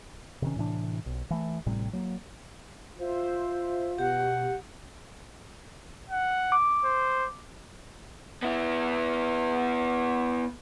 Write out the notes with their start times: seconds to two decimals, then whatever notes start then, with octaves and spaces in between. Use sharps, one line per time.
0.42 C3 D#3 C#4
0.56 A2 C3 E3 D4
1.06 B1
1.31 E3 A3
1.66 A1 A2 C3 G3
1.93 F#3 A#3
2.99 F4 C5 E5
3.98 B2 G4 F#5
6.10 F#5
6.52 D6
6.85 C5
8.43 B3 E4